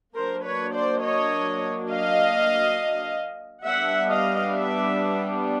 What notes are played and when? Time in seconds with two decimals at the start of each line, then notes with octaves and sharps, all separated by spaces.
0.15 F#3 A#3 D4 A#4 C5
0.44 B4 C#5
0.74 C5 D5
1.03 C#5 D#5
1.90 D#5 F5
3.65 G3 B3 D4 E5 F#5
4.09 D#5 F5
4.52 D5 E5